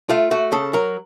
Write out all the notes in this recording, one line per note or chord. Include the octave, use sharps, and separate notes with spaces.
A3 F4
A3 F#4
C#3 A4
F#3 A#4